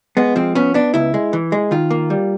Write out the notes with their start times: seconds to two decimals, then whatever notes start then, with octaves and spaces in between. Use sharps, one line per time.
0.17 G#3 B3
0.36 F3 C4
0.55 B3 C#4
0.74 B3 D4
0.94 C#2 E4
1.14 G#3
1.33 E3
1.52 G#3
1.71 D#3 F4
1.91 A#3
2.10 G3